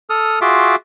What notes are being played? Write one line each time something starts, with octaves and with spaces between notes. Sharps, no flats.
A4 D#6 F6
F4 F#4 G#4 E5 C6 D6